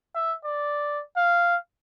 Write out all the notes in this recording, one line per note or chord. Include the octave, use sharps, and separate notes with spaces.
E5
D5
F5